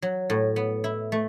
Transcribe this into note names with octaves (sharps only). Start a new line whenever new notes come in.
F#3
A2
B3
E4
A3